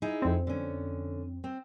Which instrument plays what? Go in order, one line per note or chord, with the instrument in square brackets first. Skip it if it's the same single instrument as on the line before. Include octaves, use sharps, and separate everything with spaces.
[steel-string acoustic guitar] D#4 E4 G#4
[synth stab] F2 C4
[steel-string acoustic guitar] D3 C#4
C4